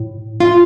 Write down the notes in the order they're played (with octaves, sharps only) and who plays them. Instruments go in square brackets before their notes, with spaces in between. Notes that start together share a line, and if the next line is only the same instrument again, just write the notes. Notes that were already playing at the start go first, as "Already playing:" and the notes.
Already playing: [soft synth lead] A2
[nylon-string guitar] F4